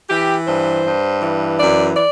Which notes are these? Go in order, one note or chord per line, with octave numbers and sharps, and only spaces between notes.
E3 G4
G2 C5
G2
E3
F#2 D5
D5